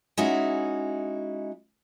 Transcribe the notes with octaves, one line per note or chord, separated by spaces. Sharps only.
G#3 C#4 D#4 E4 F#4 E5